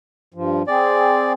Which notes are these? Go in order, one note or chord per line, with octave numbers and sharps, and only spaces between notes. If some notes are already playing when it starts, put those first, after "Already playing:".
G2 F3
C4 G#4 D5